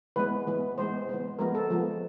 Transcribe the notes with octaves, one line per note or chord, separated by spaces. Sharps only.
E3 G#3 B3 B4
E3 G#3 B3
E3 G#3 B3 C5
E3 G#3 B3
F3 G#3 B3 A#4
A4
F3 G#3 B3